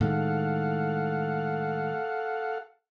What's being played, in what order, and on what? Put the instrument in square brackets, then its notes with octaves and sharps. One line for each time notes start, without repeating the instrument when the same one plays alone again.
[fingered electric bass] A2 D#3 G#3 [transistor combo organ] A4 F5 F#5